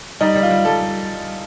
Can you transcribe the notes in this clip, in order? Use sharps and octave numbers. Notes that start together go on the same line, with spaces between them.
G3 D#4
G3
F4
G3
G3 A4
G3